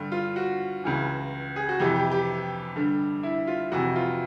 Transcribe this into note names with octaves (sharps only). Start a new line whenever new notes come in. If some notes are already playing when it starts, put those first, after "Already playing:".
Already playing: G2 D3
F4
F#4
C#2 C#3 E3
G#4
F#4
F2 C3 E3 G4
G4
G4
G2 D3
E4
F4
F2 C3 E3 F#4
F4